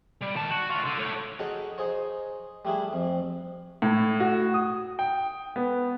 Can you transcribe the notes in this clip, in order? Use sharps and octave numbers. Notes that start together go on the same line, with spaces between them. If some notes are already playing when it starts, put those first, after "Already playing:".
G3
D#3 A5
F#4
D2 F4
D3
A3 C#5
C#4 D#4 F#4 G#4 A4 C#5
D#4 G#4 C5 C#5
G3 A3 D4 E4 G#4
F2
A2
F#4
D#6
G5
B3